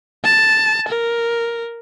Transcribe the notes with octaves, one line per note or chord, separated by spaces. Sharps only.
A5
A#4